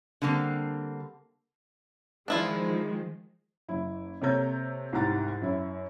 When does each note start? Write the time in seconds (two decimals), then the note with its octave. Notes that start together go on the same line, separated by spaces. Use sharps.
0.22 D3 G3 A#3 C4
2.28 D#3 F3 G#3 D4 E4 F4
3.69 F#1 E4
4.21 C3 A#3 A4 C#5 A#5 G6
4.93 C2 G#2 G4 F#5 A#5 A6
5.41 F#2 E4